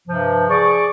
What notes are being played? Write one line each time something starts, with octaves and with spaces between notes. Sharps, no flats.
G2 C3 F3
G#4 D5 C#6 D6